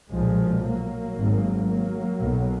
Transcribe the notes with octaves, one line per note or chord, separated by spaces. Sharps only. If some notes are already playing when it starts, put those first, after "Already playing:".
B1 A#2 F3 G#3
F#3 A#3
G#1 G#2
F#3 A#3
B1 B2